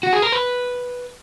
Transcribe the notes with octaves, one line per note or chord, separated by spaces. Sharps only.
F#4
G#4
A#4
B4